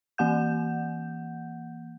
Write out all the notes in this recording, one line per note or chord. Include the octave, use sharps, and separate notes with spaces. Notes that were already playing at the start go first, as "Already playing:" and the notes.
E3 A#3 F#5 G6